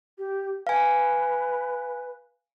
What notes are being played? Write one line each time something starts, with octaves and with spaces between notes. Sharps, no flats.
G4
B4 F5 G#5